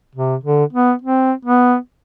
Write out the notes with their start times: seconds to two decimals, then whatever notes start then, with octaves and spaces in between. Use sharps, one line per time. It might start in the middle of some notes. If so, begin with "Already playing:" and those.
0.15 C3
0.44 D3
0.73 B3
1.02 C4
1.45 B3